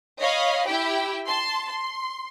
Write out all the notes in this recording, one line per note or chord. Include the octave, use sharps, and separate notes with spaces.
C#5 D#5 F5 B5
E4 G4 G5
A5 C6
C6